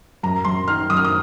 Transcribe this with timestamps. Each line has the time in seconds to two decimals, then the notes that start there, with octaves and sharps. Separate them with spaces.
0.23 F#2 A#5
0.45 F#2 C6
0.68 D#3 F6
0.90 F#2 D#6
0.97 F6
1.05 D#6